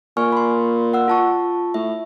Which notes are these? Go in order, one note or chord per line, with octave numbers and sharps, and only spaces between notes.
A#2 G#5 C#6 F6
B5 C6
F#5 E6
F4 A5 C#6
A2 E5